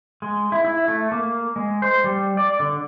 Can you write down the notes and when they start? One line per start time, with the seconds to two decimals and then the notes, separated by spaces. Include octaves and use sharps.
0.22 G#3
0.52 E4
0.65 E4
0.88 A3
1.12 A#3
1.56 G#3
1.82 C5
2.04 G3
2.37 D5
2.60 D3